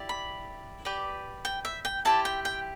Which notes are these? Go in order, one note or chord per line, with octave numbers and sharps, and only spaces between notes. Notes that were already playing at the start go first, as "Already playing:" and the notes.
Already playing: E4 G4 D5
B5
G4 B4 D5
G5
E5
G5
E4 G4 C5 A5
G5
G5